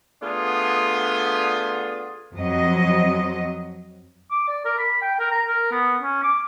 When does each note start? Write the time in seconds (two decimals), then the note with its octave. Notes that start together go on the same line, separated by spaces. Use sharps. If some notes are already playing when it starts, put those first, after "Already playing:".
0.22 D3 A3 B3 D4 F4 G#4
2.34 F2 F#3 D#5
4.31 D6
4.48 D5
4.65 A#4
4.78 B5
5.02 G5
5.19 A#4
5.31 A#5
5.46 A#4
5.71 B3
6.02 C#4
6.24 D6